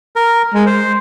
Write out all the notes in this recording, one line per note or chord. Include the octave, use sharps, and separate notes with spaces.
A#4
G#3
C5